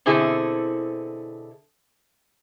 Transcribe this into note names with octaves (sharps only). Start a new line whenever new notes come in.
B2 D3 C4 E4 G#4 A4